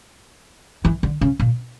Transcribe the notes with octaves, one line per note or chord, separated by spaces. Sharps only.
E3
D3
C#3
A#2